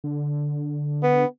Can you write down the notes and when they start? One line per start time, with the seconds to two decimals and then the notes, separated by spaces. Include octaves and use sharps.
0.04 D3
1.03 B3